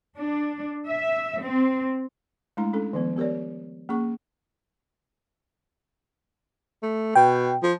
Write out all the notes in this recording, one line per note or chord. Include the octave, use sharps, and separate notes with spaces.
D4
E5
C4
G#3 A3 D4 E4 A#5
C#4 D4 A4
D#3 F3 B3
B3 G4 A#4 C#5 D5
A#3 C#4 G#4 C#6
A3
B2 G5
F3